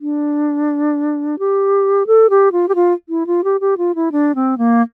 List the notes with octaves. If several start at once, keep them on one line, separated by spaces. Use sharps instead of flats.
D4
G4
A4
G4
F4
G4
F4
E4
F4
G4
G4
F4
E4
D4
C4
A#3